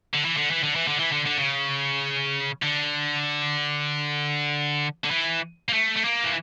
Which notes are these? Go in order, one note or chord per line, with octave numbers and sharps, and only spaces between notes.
D3
E3
D3
E3
D3
E3
D3
E3
D3
D3
C#3
D3
D3
E3
A#3
A3
A3
A#3
E3